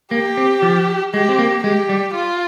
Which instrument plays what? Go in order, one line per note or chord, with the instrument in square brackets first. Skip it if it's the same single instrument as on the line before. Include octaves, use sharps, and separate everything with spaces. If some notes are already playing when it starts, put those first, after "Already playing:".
[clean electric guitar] A#3 [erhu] G4
[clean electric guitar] C4
F3
[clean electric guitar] G#3 [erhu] G4
[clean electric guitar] C4
A#3
[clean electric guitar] G#3 [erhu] G4
[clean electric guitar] G3
[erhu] F4